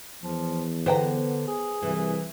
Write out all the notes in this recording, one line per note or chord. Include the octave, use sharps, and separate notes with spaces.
E2 F3
D3 B3 C5 G5 A#5
G#4
C2 E3